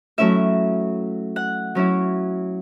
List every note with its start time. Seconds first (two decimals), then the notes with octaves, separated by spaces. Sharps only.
0.18 F#3 A3 C#4 E4 E5
1.36 F#5
1.75 F#3 C#4 E4